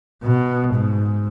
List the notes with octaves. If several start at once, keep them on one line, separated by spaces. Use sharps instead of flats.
B2
G#2